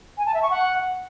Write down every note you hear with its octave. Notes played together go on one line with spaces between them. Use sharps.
G#5
A5
E5
C#6
F#5